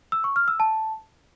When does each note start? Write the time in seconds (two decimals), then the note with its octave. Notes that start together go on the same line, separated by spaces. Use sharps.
0.12 E6
0.24 C#6
0.36 F6
0.48 E6
0.60 A5